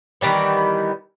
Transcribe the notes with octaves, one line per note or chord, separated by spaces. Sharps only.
D#3 E3 G3 B3